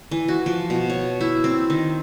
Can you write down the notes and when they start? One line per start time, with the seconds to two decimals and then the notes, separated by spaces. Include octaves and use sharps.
0.11 E3
0.28 F#4
0.46 F3
0.70 B2
0.90 C#5
1.21 E4
1.44 C4
1.70 D#3